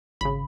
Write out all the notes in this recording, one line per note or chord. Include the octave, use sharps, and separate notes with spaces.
G#1 C#3 B5